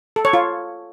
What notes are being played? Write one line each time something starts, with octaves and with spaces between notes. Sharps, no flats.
A4
C#5
F4